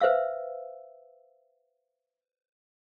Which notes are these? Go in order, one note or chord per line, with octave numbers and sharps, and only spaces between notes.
B4 C5 E5 F5 E6